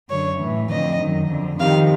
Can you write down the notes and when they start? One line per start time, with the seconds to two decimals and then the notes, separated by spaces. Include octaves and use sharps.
0.09 F#2 D3 C#5
0.40 A2 E3
0.70 F2 D3 D#5
0.99 F#2 D#3
1.29 F2 D3
1.59 F2 C3 D#3 F5